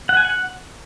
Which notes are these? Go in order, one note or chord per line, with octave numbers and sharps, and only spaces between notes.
F#5
G#5
F#5